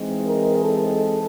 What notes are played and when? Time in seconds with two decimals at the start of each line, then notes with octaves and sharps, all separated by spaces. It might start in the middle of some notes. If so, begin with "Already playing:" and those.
Already playing: E3 G#3 C4 D#4
0.26 A#4
0.64 A4